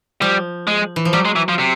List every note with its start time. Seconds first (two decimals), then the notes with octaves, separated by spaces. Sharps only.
0.22 F3 G3
0.67 G#3
0.96 E3
1.05 F3
1.13 F#3 G3
1.25 G#3
1.36 E3
1.48 F3
1.59 C3